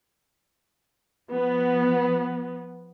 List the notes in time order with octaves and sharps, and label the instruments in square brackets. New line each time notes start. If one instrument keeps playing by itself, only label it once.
[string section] F3 B3